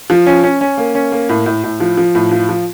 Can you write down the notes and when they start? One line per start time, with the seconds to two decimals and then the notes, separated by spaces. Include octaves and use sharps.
0.10 F3
0.26 C#4
0.43 C#4
0.61 C#4
0.77 A#3
0.95 C#4
1.12 A#3
1.29 A2
1.46 A2
1.64 A2
1.80 F3
1.97 F3
2.15 A2
2.32 F3
2.49 F3